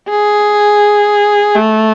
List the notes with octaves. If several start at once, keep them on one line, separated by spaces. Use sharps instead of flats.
G#4
A3